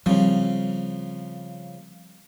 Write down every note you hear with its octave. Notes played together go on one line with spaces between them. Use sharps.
C#3 F3 G3 C4